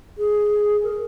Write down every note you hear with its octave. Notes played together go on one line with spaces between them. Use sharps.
G#4
A#4